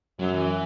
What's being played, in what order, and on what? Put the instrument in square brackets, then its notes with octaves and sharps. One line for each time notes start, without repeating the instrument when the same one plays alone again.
[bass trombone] F#2 [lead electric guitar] F#3
[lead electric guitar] E3